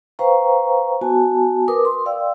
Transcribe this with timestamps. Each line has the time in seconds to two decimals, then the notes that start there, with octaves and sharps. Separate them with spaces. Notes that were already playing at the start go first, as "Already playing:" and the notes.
0.19 B4 C5 F5 G5 A#5 C#6
1.01 B3 F#4 G#5 A5
1.68 A#4 B4 D6 D#6
1.85 C6
2.06 D5 F5 G5 E6